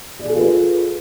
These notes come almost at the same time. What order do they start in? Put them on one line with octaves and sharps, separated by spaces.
D5 G#4 A4 F4 B4